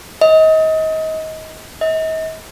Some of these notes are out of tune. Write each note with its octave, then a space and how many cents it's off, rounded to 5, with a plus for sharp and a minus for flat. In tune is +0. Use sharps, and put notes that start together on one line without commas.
D#5 +30
D#5 +45